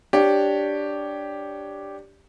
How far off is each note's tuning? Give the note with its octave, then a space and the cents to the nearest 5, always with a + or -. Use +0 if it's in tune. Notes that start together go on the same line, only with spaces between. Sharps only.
D4 +0 G4 +0 C#5 +5